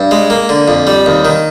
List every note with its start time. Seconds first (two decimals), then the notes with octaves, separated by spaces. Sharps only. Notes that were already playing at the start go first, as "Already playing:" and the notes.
Already playing: G2
0.11 G#3
0.30 A#3
0.49 D3
0.68 F2
0.87 G3
1.06 D#2
1.25 D#3